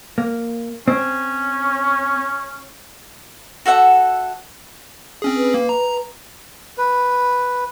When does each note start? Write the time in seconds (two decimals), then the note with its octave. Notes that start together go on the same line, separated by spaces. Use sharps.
0.18 A#3
0.88 C4 C#4
3.66 F#4 A4 E5 F#5
5.22 C4 C#4 G#4
5.37 B4
5.54 A#3
5.69 A#5
6.78 B4